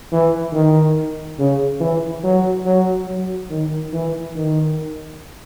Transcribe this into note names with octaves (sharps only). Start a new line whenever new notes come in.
E3
D#3
C#3
E3
F#3
F#3
F#3
D#3
E3
D#3